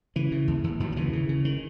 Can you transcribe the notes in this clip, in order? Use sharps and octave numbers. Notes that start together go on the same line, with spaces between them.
C#3 E3
C#3
D#2
D#2
D#2 D#3 F#3
F#3
C#3 E3
C#3
C#3
D#3